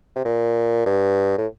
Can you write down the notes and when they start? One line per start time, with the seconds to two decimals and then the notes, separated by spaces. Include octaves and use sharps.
0.16 C3
0.25 A#2
0.86 G2
1.38 A2